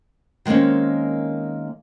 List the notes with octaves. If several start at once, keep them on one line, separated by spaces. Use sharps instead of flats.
D#3 G#3 A#3 C4 C#4